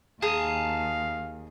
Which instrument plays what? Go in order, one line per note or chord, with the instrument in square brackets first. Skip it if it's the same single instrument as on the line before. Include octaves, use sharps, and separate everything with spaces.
[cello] D#2 [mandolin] G#4 [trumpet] F5 [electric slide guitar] A5 A#5